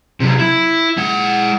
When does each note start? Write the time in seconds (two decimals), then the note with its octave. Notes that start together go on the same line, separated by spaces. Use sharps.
0.20 C3 F#3
0.40 E4
0.97 G#3 F#5